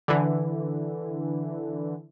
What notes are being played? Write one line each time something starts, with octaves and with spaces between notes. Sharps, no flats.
D3 E3